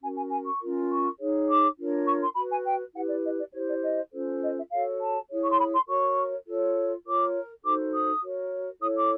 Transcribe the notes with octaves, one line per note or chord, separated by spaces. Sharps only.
C#4 F#4 A#4 G#5
G#5
G#5
C#6
C#4 F4 A#4
C#6
D#4 G#4 C#5
D6
D4 F4 A#4 C#5
C#6
C6
F#4 B4 B5
G#5
G5
E4 G4 B4 F#5
D5
D#5
D5
E4 G4 C5 C#5
D5
D#5
C#4 F4 A4 C5
D#5
E5
F#4 A4 C#5 F5
A5
E4 G#4 C#5
C#6
C6
B5
C6
F#4 A#4 C#5 C#6
F4 A4 C#5
F4 A#4 C#5 D6
D#4 F#4 A4 C5 D6
D#6
F#4 A#4 C#5
E4 A4 C#5 D#6
D6